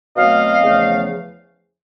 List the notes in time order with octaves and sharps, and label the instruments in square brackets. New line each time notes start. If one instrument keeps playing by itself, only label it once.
[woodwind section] B2 F#3 A3 C4 D#5 F5
E2 C#3 F3 A3